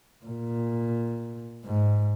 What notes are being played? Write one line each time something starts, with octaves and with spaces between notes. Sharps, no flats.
A#2
G#2